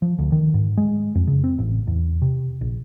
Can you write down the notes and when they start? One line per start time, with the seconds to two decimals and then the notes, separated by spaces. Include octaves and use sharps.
0.02 F3
0.19 D2
0.32 D#3
0.54 G#2
0.77 G#3
1.15 F2
1.27 C#3
1.44 C4
1.59 A1
1.87 E2
2.22 C3
2.61 A#1